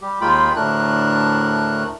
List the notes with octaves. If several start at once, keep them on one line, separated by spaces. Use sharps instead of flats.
G3 G4
D#2 G#3 A#3 F4 G5 B5
D2 A2 A3 D4 A#4 F#6